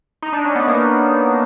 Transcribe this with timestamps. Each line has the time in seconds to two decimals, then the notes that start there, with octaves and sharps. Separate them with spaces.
0.22 D#4
0.33 D4
0.45 C#4
0.55 B3
0.68 A#3